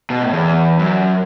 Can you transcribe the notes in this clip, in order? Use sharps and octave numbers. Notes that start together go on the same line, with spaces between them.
B2
A2
E2
F#2